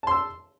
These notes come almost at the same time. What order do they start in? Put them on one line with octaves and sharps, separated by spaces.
A5 C6 E6